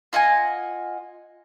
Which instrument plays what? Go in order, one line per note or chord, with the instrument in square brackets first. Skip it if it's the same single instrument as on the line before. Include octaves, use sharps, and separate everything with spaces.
[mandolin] F4 D#5 F#5 G#5